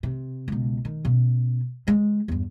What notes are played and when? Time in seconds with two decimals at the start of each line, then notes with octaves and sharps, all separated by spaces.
0.03 C3
0.48 C#2 B2
0.85 D#3
1.05 B2 C#4
1.87 D3 G#3
2.28 E2 G2